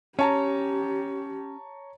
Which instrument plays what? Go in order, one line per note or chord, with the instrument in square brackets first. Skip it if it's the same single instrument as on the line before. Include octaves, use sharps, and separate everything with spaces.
[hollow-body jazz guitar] C#4 [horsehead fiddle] G4 [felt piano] C#5 A5 A#5